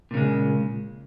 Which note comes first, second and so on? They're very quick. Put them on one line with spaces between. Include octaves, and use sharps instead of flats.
A#2 C#3 G#3